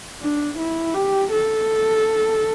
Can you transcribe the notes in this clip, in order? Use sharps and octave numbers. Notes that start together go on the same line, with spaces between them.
D4
E4
G4
A4